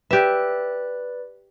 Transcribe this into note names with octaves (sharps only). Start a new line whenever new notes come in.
G4 B4 D5 E5 F#6